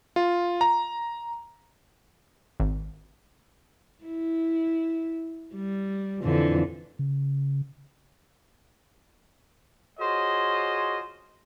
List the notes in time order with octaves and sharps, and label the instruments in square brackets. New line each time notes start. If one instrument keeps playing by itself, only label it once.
[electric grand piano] F4
A#5
[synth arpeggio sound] G#1
[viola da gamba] E4
G3
F2 D3 E3
[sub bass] C#3
[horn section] F4 F#4 G#4 C5 C#5 D#5